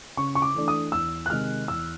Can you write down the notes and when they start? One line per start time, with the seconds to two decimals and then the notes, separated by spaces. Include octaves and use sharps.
0.17 C#3 C#6
0.35 C#6
0.42 D6
0.54 E3 A3 D4
0.68 D#6
0.92 E2 E6
1.26 F#6
1.30 C3 D#3 G#3 F6
1.68 E2 E6